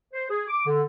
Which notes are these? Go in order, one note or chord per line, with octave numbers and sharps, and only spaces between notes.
C5
G#4
D6
D3